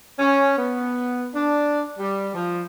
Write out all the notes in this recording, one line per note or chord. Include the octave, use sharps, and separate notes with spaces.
C#4
B3
D4
G3
F3